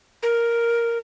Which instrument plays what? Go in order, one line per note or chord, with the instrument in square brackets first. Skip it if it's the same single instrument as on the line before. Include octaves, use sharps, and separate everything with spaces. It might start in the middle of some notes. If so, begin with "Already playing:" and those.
[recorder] A#4